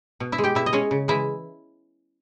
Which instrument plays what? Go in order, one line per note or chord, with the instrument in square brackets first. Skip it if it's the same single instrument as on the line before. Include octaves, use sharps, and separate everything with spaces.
[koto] B2
E4 E5
G#3
G4 G5
B2 E4 E5
D#5
G#3 C#4 C#5
C#3
E3 G#3 E4 E5